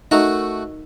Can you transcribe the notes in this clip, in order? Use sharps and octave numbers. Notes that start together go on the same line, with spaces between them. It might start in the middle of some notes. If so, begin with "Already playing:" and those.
A3 D#4 F#4 A#4 D#5 F#5